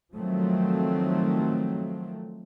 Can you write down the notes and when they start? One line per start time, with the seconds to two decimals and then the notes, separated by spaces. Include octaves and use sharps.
0.14 D#3 F3 F#3 A3 C4